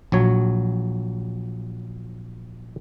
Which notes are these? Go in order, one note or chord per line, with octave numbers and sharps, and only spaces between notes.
A#1 F#3 C#5